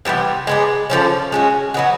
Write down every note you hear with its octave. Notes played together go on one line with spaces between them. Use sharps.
C3 E3 G3 B3
G#3 B3 D4
D3 F3 A#3 C#4
G#3 C#4 F#4
F#3 B3 D#4 F#4